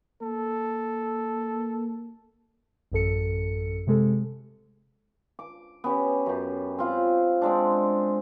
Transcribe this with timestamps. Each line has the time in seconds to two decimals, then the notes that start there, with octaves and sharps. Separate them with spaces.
0.22 A#3 A4
2.92 A1 F#2 A4 C#7
3.87 C3 G#3 A4
5.39 D6
5.84 B3 C#4 G4
6.26 F#2 G4
6.78 C4 F4
7.42 G#3 C4 D4